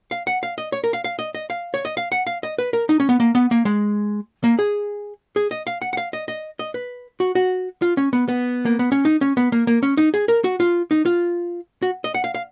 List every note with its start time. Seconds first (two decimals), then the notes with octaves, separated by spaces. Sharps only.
0.11 F5
0.27 F#5
0.43 F5
0.58 D#5
0.72 C#5
0.84 A#4
0.93 F5
1.04 F5
1.19 D#5
1.35 D#5
1.50 F5
1.74 C#5
1.85 D#5
1.97 F5
2.12 F#5
2.27 F5
2.43 D#5
2.58 B4
2.73 A#4
2.89 D#4
3.00 C#4
3.09 B3
3.20 A#3
3.35 B3
3.51 A#3
3.65 G#3
4.44 A#3
4.59 G#4
5.36 G#4
5.51 D#5
5.67 F5
5.82 F#5
5.93 F#5
5.97 F5
6.13 D#5
6.28 D#5
6.59 D#5
6.74 B4
7.20 F#4
7.35 F#4
7.82 F4
7.97 C#4
8.13 B3
8.28 B3
8.65 A#3
8.79 B3
8.92 C#4
9.05 D#4
9.21 C#4
9.37 B3
9.52 A#3
9.67 A#3
9.83 C#4
9.97 D#4
10.14 G#4
10.28 A#4
10.44 F#4
10.60 F4
10.91 D#4
11.05 F4
11.82 F#4
12.04 D#5
12.14 F#5
12.24 F5
12.35 F5